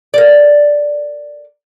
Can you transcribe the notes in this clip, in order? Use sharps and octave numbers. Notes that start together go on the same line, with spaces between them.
A#4 D5